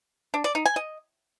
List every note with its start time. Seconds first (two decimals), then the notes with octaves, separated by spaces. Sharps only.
0.34 D4
0.44 D5
0.55 D#4
0.66 G#5
0.76 D#5